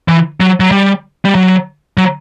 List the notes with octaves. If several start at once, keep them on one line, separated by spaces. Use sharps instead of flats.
E3
F#3
F#3
G3
G3
F#3
F#3